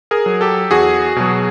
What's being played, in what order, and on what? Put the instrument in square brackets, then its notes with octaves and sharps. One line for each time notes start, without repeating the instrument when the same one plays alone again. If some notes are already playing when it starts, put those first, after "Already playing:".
[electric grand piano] G#4 A#4
F#3
G4 A4
E2 F#4 G#4
B2 F#3